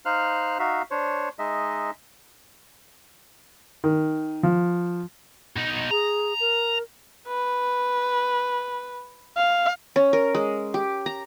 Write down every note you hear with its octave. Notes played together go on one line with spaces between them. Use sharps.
D#4 C5 F5 F6 F#6
D#4 F#4 E5 F5
D4 C5 C#5
G#3 D#4 D#5 E5
D#3
F3
B2 D#4
G#4 A#5
A#4
B4
F5
C#4
A#4
G#3
G4
A#5